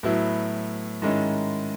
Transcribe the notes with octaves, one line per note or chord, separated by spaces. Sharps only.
A2 F#3 B3 E4
G#2 D#3 G#3 C#4 E4